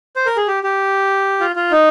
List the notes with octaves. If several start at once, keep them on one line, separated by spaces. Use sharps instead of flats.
C5
A#4
G#4
G4
G4
F4
F4
D#4